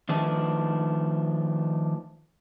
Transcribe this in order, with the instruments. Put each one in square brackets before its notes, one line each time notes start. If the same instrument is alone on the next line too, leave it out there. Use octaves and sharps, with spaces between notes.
[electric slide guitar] D#3 F3 A3 D4 B4